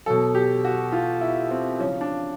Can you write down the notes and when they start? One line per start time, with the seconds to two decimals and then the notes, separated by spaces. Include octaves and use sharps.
0.06 B2 F#3 A4
0.35 G4
0.65 F#4
0.92 F4
1.21 E4
1.51 C4
1.79 F3 C#4
1.83 C#3
2.01 D4